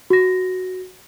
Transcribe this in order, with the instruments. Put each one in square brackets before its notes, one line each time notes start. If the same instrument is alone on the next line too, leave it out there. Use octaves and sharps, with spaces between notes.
[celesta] F#4 A#6